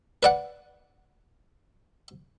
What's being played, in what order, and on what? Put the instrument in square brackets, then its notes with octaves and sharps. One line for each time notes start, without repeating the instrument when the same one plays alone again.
[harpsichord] B4 D5 F#5